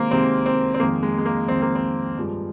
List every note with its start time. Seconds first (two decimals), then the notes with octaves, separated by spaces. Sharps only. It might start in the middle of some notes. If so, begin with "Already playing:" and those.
Already playing: C3 D#3 G#3 A#3 C4
0.11 C3 D#3 G#3 C4
0.46 C4
0.74 C4
0.80 F2 D#3 G#3 A#3
1.03 G#3
1.18 G#3
1.25 A#3
1.48 F2 D#3 G#3 C4
1.62 A#3
1.75 C4
2.17 G2 F3 G#3